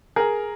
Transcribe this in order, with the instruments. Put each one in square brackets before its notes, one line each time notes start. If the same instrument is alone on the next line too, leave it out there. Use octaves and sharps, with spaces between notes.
[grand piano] G#4 A#4